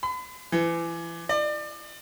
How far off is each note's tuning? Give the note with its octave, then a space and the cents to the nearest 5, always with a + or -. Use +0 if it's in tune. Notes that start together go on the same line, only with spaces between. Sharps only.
B5 +40
E3 +30
D5 +30